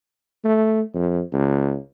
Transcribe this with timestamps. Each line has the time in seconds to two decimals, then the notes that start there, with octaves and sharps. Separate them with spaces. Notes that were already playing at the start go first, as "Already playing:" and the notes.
0.45 A3
0.94 F2
1.33 C#2